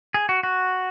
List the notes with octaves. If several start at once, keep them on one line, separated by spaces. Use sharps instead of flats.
G#4
F#4
F#4